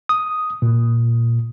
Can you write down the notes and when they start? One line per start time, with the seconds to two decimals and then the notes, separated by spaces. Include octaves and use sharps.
0.09 D#6
0.62 A#2